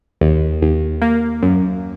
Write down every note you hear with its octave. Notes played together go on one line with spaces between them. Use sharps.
D#2
D#2
A#3
F#2